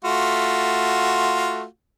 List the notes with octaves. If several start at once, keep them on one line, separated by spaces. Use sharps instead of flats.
A3 F4 F#4